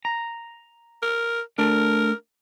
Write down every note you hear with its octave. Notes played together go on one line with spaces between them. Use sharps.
A#5
A#4
A3 D4 A#4